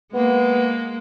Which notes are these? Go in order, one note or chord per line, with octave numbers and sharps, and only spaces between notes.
G#3 A#3 B3